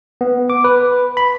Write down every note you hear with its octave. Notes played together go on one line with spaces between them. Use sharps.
B3
D6
B4
B5